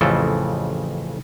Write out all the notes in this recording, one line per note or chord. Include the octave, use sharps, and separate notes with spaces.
A1 F2 C#3 A4